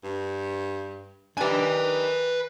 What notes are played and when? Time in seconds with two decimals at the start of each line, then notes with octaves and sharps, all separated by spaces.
0.04 G2
1.37 D#3 D4 G4 B4 G#5